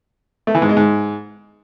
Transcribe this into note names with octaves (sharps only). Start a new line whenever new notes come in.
A3
E3
G#2
G#3
G#2